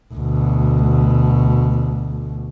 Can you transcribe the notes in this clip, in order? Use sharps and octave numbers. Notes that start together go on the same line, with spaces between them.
D2 B2